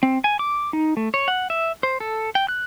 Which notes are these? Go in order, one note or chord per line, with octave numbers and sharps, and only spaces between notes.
C4
G#5
D6
D#4
A3
C#5
F#5
E5
C5
A4
G5
F#6